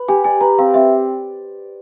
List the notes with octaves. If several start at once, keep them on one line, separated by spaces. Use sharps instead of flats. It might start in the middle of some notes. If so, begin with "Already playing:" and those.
Already playing: B4
G4 G#5
D5 G#5
B4 A#5
C4 F5
C4 E5